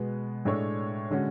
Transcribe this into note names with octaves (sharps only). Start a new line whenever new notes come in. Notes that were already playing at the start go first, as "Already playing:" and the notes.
Already playing: B2 G#3 B3
A2 G#3 D4 A4 C#5
D3 G#3 C#4 F#4